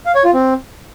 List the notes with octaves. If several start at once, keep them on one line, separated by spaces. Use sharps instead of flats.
F5
C#5
F4
C4